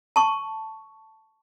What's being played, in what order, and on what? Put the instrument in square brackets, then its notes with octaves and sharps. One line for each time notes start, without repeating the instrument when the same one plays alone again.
[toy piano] A5 C#6